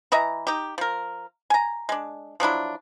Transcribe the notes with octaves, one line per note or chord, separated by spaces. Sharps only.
E3 D#5 E5 A#5
D#4 G4
F3 A#4
G#5 A#5
G#3 D4
F3 F#3 D4 E4